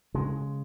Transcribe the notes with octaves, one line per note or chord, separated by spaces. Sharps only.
C#3 G#3